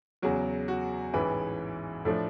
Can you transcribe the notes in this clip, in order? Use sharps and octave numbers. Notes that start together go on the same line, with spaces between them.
E2 C#3 F#3 F#4
F#4
A1 G#2 E3 B4
A2 F3 A3 D4